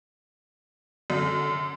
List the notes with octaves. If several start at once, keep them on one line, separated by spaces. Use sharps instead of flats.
F#2 D3